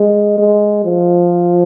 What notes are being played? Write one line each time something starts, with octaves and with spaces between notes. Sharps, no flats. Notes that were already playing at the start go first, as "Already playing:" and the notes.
Already playing: G#3
G#3
F3